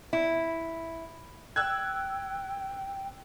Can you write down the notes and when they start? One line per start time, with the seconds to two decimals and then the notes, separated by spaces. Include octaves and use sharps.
0.13 E4
1.56 G5 E6 F#6 G#6